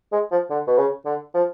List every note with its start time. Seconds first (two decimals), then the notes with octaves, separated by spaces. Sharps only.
0.12 G#3
0.31 F3
0.50 D3
0.67 B2
0.78 C#3
1.06 D3
1.34 F3